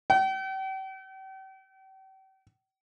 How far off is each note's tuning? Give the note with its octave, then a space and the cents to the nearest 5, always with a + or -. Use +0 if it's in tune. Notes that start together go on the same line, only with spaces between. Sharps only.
G5 -40